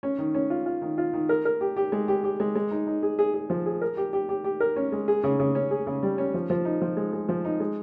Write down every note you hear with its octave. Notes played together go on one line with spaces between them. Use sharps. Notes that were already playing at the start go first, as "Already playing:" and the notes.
C#4
D#3
C#4
F4
F4
D#3
F4
D#3
A#4
A#4
G4
G4
G#3
G4
G4
G#3
G#3
D#4
D#4
G#4
G#4
G#4
F3
G#4
A#4
G4
G4
G4
G4
A#4
C#4
G#3
G#4
C#3
C#3
C#4
G#4
C#3
G3
C#4
F3
F3
D#4
F3
G#3
G#3
F3
D#4
G#3